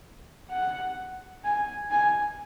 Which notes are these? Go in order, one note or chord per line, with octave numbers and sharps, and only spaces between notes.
F#5
G#5
G#5